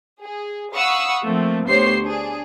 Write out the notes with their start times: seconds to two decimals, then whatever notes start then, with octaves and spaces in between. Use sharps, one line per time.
0.23 G#4
0.73 F5 F#5 B5 C#6 D#6 E6
1.23 F3 A3 A#3 C4
1.66 D2 B3 G4 C5 C#5 C7
2.03 D4 G#4